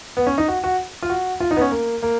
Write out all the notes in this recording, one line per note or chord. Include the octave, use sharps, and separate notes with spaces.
B3
C#4
D#4
F#4
F#4
F4
F#4
F4
D#4
B3
C#4
A#3
A#3